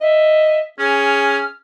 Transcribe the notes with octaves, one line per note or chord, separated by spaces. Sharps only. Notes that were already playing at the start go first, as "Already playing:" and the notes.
D#5 E5
C#4 G#4 F6